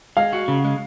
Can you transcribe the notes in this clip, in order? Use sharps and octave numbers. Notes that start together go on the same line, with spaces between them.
G#3 F5
F#4
C#3
G#3